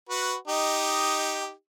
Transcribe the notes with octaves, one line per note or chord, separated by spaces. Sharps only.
F#4 B4
D#4 G4 D#5